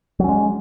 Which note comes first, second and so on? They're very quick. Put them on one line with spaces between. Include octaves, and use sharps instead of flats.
F#3 C#4 G#3